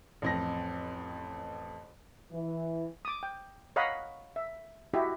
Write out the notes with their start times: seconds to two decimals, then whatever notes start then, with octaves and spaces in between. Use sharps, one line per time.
0.22 A1 F2 A#6
2.32 E3
3.05 D6 D#6
3.23 G5
3.76 C#5 D#5 F5 F#5 A#5 B5
4.36 E5
4.94 E4 F#4 G4 D#5 E5